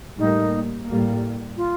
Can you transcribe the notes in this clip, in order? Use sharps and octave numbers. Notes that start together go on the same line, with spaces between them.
A2 G3 A#3 D#4
A2 G3 A#3
F4